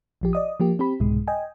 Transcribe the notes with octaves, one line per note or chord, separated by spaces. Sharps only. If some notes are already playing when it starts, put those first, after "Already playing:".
A#1 F3 G4
D5 D#5 D#6
F3 A#3 G4
C4 G4 B5
C2 G#2 B2 G#3
D#5 G5 G#5